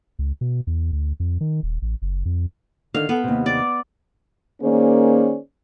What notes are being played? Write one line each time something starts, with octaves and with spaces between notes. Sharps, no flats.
C#2
B2
E2
D2
F2
D#3
D#1
A1
F#1
F2
D3 D#3 F5
B3 A4
D#2 C3
D5
D#3 A#3 C#4 G#4 C5 D5